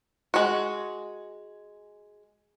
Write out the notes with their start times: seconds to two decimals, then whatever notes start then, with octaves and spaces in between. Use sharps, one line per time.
0.34 G#3 F#4